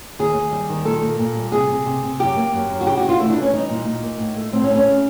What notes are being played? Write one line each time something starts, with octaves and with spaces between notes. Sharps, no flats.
D#2 G#4
D#2
G3
D#3
A#2 A4
A#2
A#2
G3
C3 G#4
C3
C3
C3
F#2 G4
A#3
F#2
F#2
F#4
C#3 G4
F#4
E3
F4
A3 E4
D4
E3
C#4
G3 D#4
A#2
A#2
A#3
A2
A3
A2 C4
C#4
A3
C#4
C#3